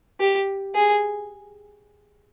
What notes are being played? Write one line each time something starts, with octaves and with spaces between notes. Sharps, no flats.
G4
G#4